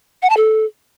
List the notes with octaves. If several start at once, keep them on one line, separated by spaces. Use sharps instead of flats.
F#5
A5
A4